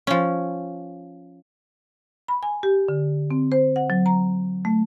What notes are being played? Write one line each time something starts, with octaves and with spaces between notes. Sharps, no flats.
F3 C#4
B5
G#5
G4
D3
C4
C5
F#5
F#3
A#5
A3